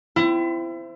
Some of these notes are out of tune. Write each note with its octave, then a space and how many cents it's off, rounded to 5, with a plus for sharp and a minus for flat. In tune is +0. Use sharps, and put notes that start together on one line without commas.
C4 -15 E4 +30